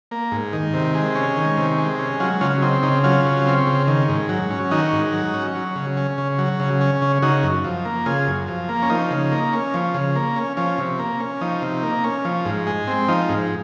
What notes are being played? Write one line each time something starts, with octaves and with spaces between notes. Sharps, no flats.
A#3
G#2
D#3
C3
G#3
C#4
D#3
C3
G#3
C#4
F#3 C#4 F4
C#3 C#4 F4
C4 D#4
C#3 D#4
F#3 C#4 F4
C#3
C4
C#3
D#3
G#2
F#3
C#4
D#3 D#4 F#4
G#2
F#3
C#4
F#3
C#3
C#4
C#3
F#3
C#3
C#4
C#3
C#3 D#4 F#4
F#2
F3
A#3
C#3 F4 G#4
F#2
F3
A#3
C#4
F3 D#4
C#3
A#3
C#4
F3
C#3
A#3
C#4
F3 C#4
C3
A#3
C#4
F3 D#4
C3
A#3
C#4
F3
G#2
G#3
C4
F3 D#4
G#2